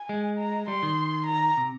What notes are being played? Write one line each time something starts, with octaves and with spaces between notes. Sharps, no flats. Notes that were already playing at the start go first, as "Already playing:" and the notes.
Already playing: G#5
G#3
A#5
G3 C6
D#3
A#5
C3